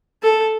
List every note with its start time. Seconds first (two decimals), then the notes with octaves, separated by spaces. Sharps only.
0.23 A4